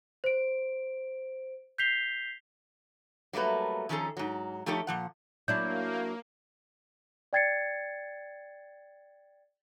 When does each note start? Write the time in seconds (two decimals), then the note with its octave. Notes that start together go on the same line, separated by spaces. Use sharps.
0.24 C5 D7
1.78 G6 B6 C7 F7 G7
3.33 F#3 G3 A3 A#3 B4
3.89 D#3 F3 C#4 G#4 A4 A#5
4.17 G#2 F#3
4.66 F3 A3 D#4 G4 A4 C#5
4.87 A#2 F3 F#5
5.48 F#3 A#3 D4 E4 G6
7.33 D5 G5 G#6 A6 C7 C#7